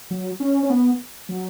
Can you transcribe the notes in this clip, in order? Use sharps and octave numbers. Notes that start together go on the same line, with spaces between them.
F#3
C#4
C#4
B3
F#3